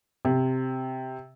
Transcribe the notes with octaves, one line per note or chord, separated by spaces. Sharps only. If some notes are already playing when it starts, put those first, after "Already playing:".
C3